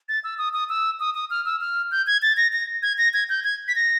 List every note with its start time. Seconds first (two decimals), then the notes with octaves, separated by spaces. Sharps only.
0.09 A6
0.24 E6
0.38 D#6
0.53 D#6
0.69 E6
1.00 D#6
1.14 D#6
1.30 F6
1.46 E6
1.61 F6
1.91 G6
2.07 G#6
2.22 A6
2.37 A#6
2.53 A#6
2.83 G#6
2.98 A#6
3.14 G#6
3.29 G6
3.44 G#6
3.68 B6
3.75 A#6